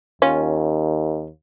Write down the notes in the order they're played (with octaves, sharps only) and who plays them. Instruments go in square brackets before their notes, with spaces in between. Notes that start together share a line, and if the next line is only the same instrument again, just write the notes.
[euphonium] D#2 [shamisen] C#4 F4